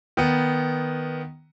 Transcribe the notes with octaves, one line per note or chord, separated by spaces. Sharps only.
D#3 B3